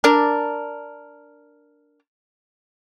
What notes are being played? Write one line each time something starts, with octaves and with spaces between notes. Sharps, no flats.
D4 A#4